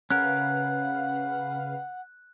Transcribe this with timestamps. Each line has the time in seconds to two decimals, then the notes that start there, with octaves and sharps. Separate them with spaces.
0.10 C#3 C#4 A#4 B4 F5 F#5 F#6